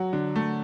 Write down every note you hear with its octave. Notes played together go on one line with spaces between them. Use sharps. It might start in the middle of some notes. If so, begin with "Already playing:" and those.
Already playing: F#3 F#5
D3
A3